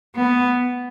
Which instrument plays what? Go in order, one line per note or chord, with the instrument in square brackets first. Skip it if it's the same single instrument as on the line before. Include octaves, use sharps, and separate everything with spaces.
[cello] B3